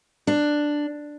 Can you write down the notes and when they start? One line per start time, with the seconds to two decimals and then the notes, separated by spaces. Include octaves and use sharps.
0.27 D4